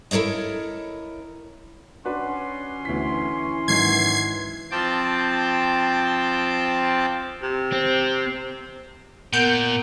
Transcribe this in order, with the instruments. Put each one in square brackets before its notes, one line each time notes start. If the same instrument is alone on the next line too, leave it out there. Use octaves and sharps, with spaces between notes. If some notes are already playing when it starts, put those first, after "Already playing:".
[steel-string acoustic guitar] E4 A4 A#4 C#5 D#5
[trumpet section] C#4 C6 [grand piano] D4 F#4 B4
[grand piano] D2 B6 [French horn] E3
[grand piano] C#6
[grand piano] G#2 D#3 F#3 [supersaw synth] G#6 C7
[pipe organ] F3 C4 G5 A5 D6
[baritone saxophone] C3
[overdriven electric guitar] C4
[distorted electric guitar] A#2 [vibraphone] B3 A#4 F#5 [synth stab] G6 D7